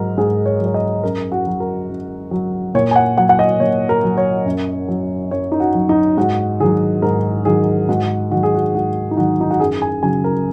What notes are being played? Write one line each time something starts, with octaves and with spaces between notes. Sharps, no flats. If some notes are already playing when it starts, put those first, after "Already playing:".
Already playing: G#2 F#3 A#4
G#2 G#4
C#5
F#3
C#5
D#5
F#2 A#4
F#4
F#3
A#4
F#2
F#3
A#2 C#5
G#5
F#5
F#3 F#5
F#5
D#5
A#2 C#5
A#4
F#3
C#5
F#2
F#3
F#2 C#5
D#4
F#4
F#3
D#4
G#2 F#4
D#3 F#3 G#4
G#2 A#4
D#3 F#3 G#4
G#2 F#4
D#3 F#3 F#4
G#4
F#4
G#2 F#4
D#4
D#3 F#3 F#4
D#4
F#4
F#2 G#4
G#5
C#3 F#3 G#5
A#4